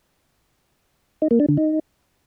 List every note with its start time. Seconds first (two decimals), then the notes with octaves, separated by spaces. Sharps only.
1.22 D#4
1.31 A#3
1.40 D4
1.49 D3
1.58 D#4